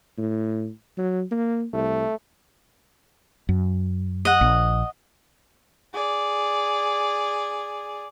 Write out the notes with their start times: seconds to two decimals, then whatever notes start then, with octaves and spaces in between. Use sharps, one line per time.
0.18 A2
0.98 F#3
1.31 A#3
1.73 C2 A3
3.49 F#2
4.25 D#5 F#5
4.41 A#1
5.94 G#4 D5